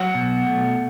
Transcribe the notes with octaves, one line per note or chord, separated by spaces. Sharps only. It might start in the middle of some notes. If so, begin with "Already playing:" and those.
Already playing: F#3 F#5
B2
A3